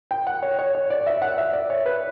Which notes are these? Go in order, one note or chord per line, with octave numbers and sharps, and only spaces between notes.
G5
F#5
C#5
C#5
C#5
D5
E5
F#5
E5
D5
C#5
B4